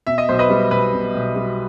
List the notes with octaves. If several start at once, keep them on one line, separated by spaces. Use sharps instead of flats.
B2 E5
D#5
B1 C5
B4 D#5
G3
B1 B4
B2
B1
G3